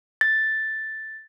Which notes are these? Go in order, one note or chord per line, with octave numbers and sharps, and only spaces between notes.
A6